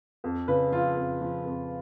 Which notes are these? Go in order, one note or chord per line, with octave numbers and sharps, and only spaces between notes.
F2
C#3 B4
F3 F4
F2
F3
F2